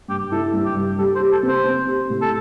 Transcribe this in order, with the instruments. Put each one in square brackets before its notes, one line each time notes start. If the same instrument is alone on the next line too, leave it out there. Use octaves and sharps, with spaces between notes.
[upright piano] G2 [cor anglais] G4
[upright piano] E4 [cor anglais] A4
[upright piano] G2
[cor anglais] G4
[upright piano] G3
[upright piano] G4 [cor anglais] A4
[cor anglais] C5
[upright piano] G4
[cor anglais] A4
[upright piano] C4
[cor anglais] C5
[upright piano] C4
G4
A2
[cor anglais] A4